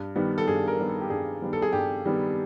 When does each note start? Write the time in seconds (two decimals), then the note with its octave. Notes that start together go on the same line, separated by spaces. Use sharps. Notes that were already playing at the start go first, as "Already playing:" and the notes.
Already playing: G2
0.16 D#3 G3 B3
0.38 A4
0.48 G2 G#4
0.68 A#4
0.79 D#3 G3 B3
0.90 A4
1.01 G4
1.10 G2 G#4
1.42 D#3 G3 B3
1.53 A4
1.62 G#4
1.73 G2 G4
2.05 D#3 G3 B3